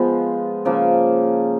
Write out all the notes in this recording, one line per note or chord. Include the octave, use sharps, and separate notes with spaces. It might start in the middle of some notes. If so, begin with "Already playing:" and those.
Already playing: F3 G#3 B3
C#3 F3 A#3